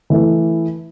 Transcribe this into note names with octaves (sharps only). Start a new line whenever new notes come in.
E3 A3 E4